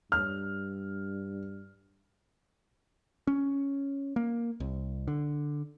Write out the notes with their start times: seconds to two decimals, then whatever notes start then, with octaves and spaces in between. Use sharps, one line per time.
0.12 G2 F6
3.27 C#4
4.16 A#3
4.60 C2
5.08 D3